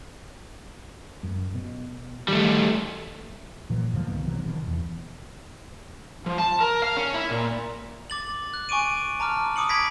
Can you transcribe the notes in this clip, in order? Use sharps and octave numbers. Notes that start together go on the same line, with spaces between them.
F#2
B2
D#3 G3 A3
A#2 E3 F#3
G2 D3 F3 A#3
C2 D#3 B3
C3 E3 F#3
B2 D#3
E2
F3
A5
A#4
F5
C#4
E4
A#2
D6 A6 F#7
F#6
G#5 C#6 D6 D7 D#7
A5 A#5 D6 F6
B5 D6 D#6 C#7 F#7
A#5 B5 G#6 A#6 B6 D7